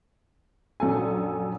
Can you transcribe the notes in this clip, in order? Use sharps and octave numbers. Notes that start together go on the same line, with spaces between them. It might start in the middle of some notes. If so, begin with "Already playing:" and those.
A#1 F#2 A4 G#5